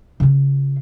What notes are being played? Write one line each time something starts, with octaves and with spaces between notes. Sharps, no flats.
C#3 F4